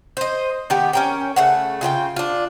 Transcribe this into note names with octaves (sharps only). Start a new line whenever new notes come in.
C5 D#5
D#3 B3 G4
C#4 A#4 G5
C#3 A3 F#5
C#3 F4 C5 G5
D4 F4